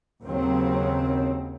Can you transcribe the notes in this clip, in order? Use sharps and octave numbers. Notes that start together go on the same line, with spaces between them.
D#2 C#3 F#3 C4